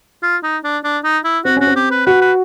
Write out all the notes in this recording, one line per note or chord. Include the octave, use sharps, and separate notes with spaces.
F4
D#4
D4
D4
D#4
E4
C4 F#4
C#4 F#4
C4
G4
B4
F#4 B4
B4